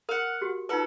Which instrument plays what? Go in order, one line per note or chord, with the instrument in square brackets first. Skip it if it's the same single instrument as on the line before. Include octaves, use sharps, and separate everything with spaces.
[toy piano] A#4 [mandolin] F5 F#5
[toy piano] F#4 G4
[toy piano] D#4 F4 B4 [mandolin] A4 F#5